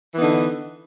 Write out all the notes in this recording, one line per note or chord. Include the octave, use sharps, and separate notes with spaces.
D3 E3 B3 D#4